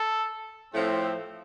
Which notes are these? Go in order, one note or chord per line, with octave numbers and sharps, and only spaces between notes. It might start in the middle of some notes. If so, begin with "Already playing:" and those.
Already playing: A4
A2 F3 A3 C4